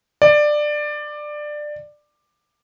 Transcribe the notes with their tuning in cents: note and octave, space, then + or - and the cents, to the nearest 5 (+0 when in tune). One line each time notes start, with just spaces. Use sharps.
D5 +15